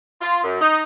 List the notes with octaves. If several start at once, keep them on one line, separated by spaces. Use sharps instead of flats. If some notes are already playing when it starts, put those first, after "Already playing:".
F4
F#2
D#4